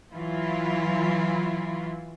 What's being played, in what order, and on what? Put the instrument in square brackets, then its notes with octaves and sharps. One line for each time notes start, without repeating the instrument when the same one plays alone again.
[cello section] E3 F#3 E4 F4